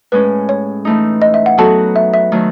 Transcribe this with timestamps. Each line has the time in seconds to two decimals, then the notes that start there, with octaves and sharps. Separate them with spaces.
0.12 A2 G#3 C#4 B4
0.49 C#5
0.85 E3 A3 D#4
1.22 D#5
1.34 E5
1.46 F#5
1.58 F#3 B3 D#4 F#4 A4 A5
1.96 E5
2.14 E5
2.32 D#3 F#3 A3